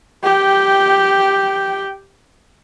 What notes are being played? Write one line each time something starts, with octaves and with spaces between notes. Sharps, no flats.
G4 G5